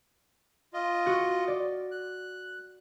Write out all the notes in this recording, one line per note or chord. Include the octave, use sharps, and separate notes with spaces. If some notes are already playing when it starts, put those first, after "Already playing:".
F4 D#5
F#4
D5
F#6